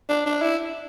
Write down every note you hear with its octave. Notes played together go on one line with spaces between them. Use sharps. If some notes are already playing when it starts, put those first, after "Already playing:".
D4
D4
E4